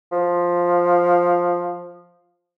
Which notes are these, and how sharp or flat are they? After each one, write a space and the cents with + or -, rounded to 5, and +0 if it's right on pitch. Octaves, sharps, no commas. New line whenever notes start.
F3 +5